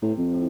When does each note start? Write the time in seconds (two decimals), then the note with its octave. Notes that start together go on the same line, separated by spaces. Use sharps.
0.02 A2 C3
0.18 F2
0.32 A2